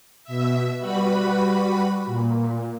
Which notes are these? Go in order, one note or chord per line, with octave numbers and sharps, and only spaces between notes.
B2 E5
G3 F#4 B4 B5
A#2